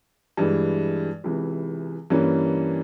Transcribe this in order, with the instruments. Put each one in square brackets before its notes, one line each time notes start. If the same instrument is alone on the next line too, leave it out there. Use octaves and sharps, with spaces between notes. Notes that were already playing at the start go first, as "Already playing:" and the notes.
[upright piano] G2 E3 G#3
C#2 C3 E3
G2 E3 A#3 C#4